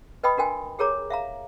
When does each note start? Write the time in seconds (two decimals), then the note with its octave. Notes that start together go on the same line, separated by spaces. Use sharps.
0.23 B4 D#5 G5 B5 D#6
0.37 D4 F#4 A#4 G5 G#5
0.79 G4 G#4 A#4 C#5 A#5 D6
1.10 E5 F5 A#5